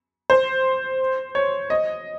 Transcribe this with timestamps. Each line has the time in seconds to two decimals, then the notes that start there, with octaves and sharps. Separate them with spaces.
0.30 C5
1.35 C#5
1.70 D#5